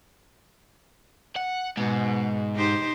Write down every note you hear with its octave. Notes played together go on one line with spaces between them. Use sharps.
F#5
G#2 B2
D#4 G4 C5